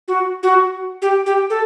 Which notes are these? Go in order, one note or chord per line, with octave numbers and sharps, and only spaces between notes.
F#4
F#4
G4
G4
A4